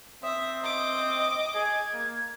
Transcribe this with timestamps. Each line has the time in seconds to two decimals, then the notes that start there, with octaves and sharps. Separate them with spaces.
0.23 C4 E5 D#6
0.64 D#5 D6
1.54 G#4 G#6
1.93 A#3